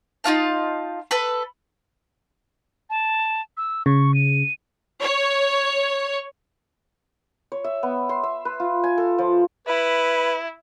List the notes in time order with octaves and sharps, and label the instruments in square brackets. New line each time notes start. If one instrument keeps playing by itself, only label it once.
[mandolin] D#4 F4 F5 A5
A4 B4 B5
[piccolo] A5
E6
[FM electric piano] C#3 [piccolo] C#6
[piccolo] D#7
[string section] C#5
[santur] C#5
E5
B3
C6
E5
B4
F4
G#5
A4
F3
[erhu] E4 [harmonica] B4